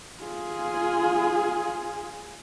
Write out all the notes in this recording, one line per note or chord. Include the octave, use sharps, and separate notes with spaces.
F4 G#4